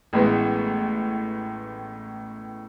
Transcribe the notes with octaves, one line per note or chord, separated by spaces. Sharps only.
A1 A2 E3 G#3 B3